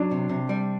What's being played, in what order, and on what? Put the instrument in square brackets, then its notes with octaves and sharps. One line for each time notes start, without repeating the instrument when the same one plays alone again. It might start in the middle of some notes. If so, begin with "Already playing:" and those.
Already playing: [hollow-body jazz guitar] F#3 [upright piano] D4
[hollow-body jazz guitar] C3
C3
G3